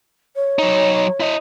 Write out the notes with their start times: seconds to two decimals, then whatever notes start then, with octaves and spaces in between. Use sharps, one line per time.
0.35 C#5
0.59 F#3 D#4
1.20 E4 D#5